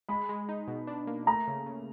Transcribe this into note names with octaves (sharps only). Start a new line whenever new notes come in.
G#3 B5
G#3
D#4
B2
D4
A#3
A3 A#5
C#3
C#3